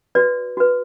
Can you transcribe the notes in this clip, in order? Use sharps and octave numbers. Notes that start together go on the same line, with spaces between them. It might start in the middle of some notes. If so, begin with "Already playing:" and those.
F#4 B4 D5
F#4 B4